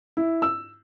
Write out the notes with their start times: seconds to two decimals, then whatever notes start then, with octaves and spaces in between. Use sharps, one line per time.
0.17 E4
0.42 E6